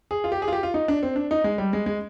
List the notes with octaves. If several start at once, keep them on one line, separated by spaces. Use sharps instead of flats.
G#4
F4
G4
G#4
F4
G4
F4
D#4
D4
C4
D4
D#4
G#3
G3
G#3
G#3